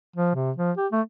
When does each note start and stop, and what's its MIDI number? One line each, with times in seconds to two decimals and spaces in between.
0.16 0.32 53
0.35 0.51 48
0.57 0.72 53
0.77 0.87 67
0.92 1.01 57